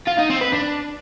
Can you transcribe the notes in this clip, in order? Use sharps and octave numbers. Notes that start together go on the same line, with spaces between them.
F4
D#4
C4
B4
D4